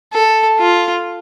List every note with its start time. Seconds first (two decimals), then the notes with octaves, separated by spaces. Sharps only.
0.13 A4
0.59 F4